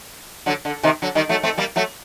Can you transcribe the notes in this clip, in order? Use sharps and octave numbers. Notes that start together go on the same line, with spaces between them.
D3 F#3
D3
C3 D#3
D3 F#3
D#3 G3
F#3 A3
A3 C4
G3 A#3
F#3 A3